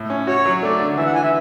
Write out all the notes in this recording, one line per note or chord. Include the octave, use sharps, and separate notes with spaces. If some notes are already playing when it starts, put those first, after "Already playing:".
Already playing: A2
C#4
F#4 C#5
F#3
A3 D5
D3
E3 E5
F#5
E3 G#5
E5